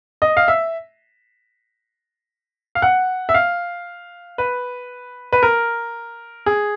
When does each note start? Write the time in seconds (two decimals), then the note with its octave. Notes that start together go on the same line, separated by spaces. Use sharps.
0.22 D#5
0.37 F5
0.48 E5
2.75 F5
2.82 F#5
3.29 E5
3.34 F5
4.38 B4
5.32 B4
5.43 A#4
6.46 G#4